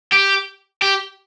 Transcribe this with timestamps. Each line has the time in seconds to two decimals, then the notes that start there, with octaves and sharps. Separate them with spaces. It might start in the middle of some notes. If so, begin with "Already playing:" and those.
0.13 G4
0.82 G4